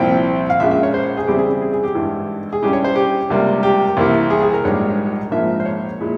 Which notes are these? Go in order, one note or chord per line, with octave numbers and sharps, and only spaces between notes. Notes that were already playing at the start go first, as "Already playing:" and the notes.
Already playing: C2 A#2 F3 C4 E4 G5
F5
A#1 A#2 G#3 C#4 E5
E5
C#5
C5
G#4
E2 C#3 G3 C4 E4 G4
G#4
G#4
G#4
G4
G#1 G2 E3
G#4
G2 G3 C#4 E4 G4
C#5
C5
G4
C#2 C3 G3 A#3
G4
C2 C3 E3 A#3 E4
G#4
G#4
A#4
A#1 G#2 G3 A#3 C#5
A#1 G#2 F3 A#3 E5
C5
C#5
A#2 G#3 E4